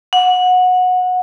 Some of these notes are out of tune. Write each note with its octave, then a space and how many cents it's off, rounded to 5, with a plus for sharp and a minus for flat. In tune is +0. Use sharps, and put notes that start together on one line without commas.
F#5 -20